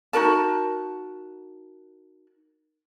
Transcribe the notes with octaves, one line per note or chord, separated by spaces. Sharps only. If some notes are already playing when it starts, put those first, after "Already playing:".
D#4 F#4 A#4 A5